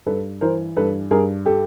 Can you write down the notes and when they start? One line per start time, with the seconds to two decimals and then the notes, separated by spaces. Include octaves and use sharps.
0.06 G2 A4 B4
0.41 E3 A#4 C5
0.76 G2 A4 B4
1.11 G2 G#4 A#4
1.46 G4 A4